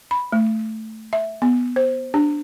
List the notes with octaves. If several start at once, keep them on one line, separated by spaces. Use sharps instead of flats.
B5
A3
E5
B3
C5
D4